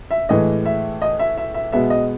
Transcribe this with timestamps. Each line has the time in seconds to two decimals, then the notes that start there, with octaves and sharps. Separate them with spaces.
0.11 E5
0.29 A2 E3 G#3 D#5
0.66 E5
1.02 D#5
1.19 E5
1.38 E5
1.54 E5
1.72 B2 G#3 B3 E5
1.90 D#5